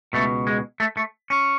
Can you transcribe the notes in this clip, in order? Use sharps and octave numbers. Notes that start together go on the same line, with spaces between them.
C#2 B2 A3
G#3
A3
A3
C#4